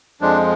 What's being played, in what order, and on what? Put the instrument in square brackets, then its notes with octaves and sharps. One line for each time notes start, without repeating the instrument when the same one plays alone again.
[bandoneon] F2 F3 G#3 D4